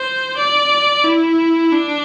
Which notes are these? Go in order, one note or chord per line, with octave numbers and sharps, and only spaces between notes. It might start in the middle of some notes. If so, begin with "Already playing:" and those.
Already playing: C5
D5
E4
D4